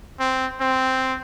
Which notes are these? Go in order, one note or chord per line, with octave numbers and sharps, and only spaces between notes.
C4
C4